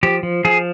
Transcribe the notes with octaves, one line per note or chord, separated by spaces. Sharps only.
F3 G4
F3
F3 G#4